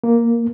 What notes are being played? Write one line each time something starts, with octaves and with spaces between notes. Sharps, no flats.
A#3